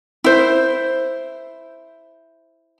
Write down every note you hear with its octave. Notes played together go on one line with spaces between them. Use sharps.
E4 C5